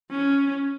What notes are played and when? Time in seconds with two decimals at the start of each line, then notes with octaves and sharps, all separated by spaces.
0.11 C#4